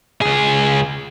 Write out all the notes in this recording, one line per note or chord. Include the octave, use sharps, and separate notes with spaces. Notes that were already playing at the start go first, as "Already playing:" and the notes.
C#2 G#4